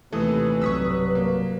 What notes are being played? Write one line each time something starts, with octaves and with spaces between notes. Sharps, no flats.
D#2 C3 E3 A3 A4 B4 D#6 E6
B1 G2 C3 F#3 C#6 D#6 E6 B6
A#3